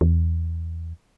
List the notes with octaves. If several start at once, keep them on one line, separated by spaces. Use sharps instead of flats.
E2